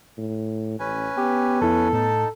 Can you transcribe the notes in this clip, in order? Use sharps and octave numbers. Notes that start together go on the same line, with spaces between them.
A2
A1 C#4 B4 G#5
B3 G4
F2 E4 A4
A2 D#4 A5